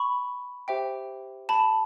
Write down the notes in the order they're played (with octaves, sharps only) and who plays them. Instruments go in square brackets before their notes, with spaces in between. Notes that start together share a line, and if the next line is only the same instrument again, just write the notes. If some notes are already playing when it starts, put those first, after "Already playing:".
Already playing: [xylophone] B5 C#6
G4 C5 E5 G5
A5 B5